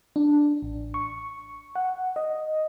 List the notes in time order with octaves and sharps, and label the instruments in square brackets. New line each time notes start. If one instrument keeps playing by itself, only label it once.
[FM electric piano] D4
A1
C#6
F#5
D#5